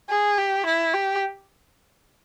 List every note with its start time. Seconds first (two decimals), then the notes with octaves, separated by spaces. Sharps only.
0.09 G#4
0.38 G4
0.66 E4
0.94 G4